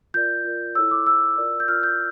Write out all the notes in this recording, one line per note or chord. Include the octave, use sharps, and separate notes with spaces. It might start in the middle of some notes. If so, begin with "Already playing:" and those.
F4 A#4 D5 G6
F4 A#4 D5
E4 A4 C#5 E6
D6
E4 A4 C#5 E6
F4 A#4 D5
G6
F4 A#4 D5 F6
G6